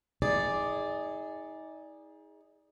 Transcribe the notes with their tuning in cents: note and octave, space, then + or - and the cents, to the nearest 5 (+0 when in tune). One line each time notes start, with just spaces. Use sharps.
D#4 +35 G#4 -10 D5 +0